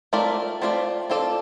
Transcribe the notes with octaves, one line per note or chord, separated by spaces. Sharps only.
A3 C4 F4 A#4 D5
A3 C4 F4 A#4 D5
C4 F4 A4 D5